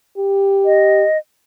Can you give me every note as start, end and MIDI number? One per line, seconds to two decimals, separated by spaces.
0.18 1.05 67
0.65 1.18 75